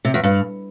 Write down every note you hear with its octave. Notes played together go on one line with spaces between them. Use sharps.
C3
E2
G2